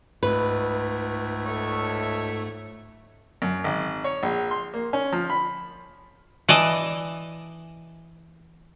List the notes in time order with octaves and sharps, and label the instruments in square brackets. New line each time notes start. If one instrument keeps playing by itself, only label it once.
[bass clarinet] C#2 [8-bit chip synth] G#2 A3 [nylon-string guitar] B4
[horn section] A4 C#5 E5
[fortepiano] F#2
G#1
C#5
A#1
C6
A#3
C#4
F3
B5
[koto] E3 D5 D#5 A5